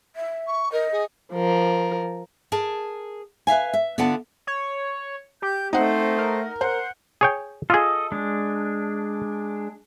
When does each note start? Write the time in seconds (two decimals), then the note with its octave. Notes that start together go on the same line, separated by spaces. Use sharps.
0.16 E5
0.47 C#6
0.72 A#4 D#5
0.92 G#4
1.33 F3 A#4
2.52 G#4 A#4 A5
3.47 B4 E5 F5 G#5
3.73 E5
3.98 D3 B3 F4 D5 F#5 A5
4.47 C#5
5.42 G4 G6
5.73 A3 C4 D#4 C5 F#5
6.18 A#4
6.61 C5 F#5
7.21 G#4 C#5 G5
7.70 F4 G#4 A4 D#5
8.12 G#3 D4